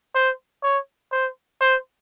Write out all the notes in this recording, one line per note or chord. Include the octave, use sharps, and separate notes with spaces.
C5
C#5
C5
C5